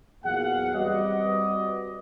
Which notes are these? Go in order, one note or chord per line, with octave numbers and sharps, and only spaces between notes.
E2 A#2 F#3 G#4 F5 F#5
G3 C4 F#4 B4 D5 D#5